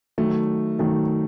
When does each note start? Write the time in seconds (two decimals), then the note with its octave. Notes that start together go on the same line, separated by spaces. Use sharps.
0.18 D#3 F#3 A3
0.79 D#3 F#3 A3